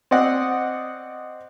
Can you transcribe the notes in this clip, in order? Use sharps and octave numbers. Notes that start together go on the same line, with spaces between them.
C4 D5 D#5 F#5